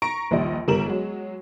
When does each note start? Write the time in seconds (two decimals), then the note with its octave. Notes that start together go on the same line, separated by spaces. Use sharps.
0.02 A#5 C#6 A#6 D7
0.31 A#1 D#2 G3 D#5
0.68 G1 G3 A#4 E7 F#7
0.86 F#3 G#3